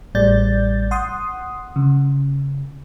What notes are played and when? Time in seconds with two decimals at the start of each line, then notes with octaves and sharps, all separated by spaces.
0.15 A1 A2 G3 D5 G6 A6
0.91 F#5 C6 D#6
1.76 C#3